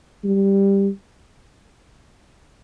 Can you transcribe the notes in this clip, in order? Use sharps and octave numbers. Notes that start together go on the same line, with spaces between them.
G3